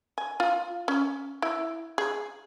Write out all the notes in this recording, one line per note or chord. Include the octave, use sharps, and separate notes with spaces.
G#5
F4
C#4
E4
G#4